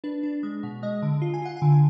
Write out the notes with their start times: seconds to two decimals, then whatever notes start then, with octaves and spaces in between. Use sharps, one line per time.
0.04 D4 B4
0.23 D4
0.43 G#3
0.63 B2
0.83 G#3 D#5
1.02 D3
1.22 F4
1.34 G#5
1.42 F4 F#5
1.57 D3 G#5